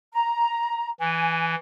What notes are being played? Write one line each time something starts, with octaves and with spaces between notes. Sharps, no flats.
A#5
E3 G#5